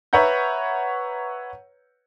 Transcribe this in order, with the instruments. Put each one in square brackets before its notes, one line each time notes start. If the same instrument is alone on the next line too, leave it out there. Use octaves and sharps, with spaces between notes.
[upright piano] B4 C#5 E5 F#5 A#5 G6